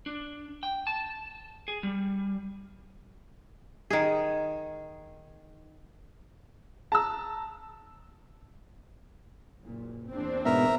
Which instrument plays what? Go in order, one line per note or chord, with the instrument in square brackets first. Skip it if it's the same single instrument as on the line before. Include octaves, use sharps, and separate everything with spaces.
[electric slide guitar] D4
G5
A5
G#4
G3
[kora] D#3 G#4
[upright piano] A5 A#5 E6
[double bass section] F#1 F#2 A#2
[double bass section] E2 A#2 [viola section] C4 D4
[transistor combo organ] G#2 B2 B3 [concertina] A#4 E5 A#5